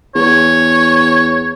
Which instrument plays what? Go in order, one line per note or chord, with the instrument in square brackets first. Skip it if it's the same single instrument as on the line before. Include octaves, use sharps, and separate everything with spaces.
[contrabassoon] E2 [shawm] C#5